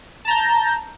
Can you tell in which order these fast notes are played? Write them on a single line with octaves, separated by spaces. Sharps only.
A5 A#5 G6